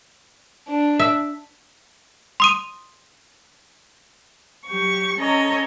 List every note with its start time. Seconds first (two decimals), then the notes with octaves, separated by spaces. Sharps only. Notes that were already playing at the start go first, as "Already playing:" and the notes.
0.69 D4
0.99 E5
2.40 C6 D#6 D#7
4.67 F#3 G4 C#6
5.19 C#4 A4 C#5 D#5 A#5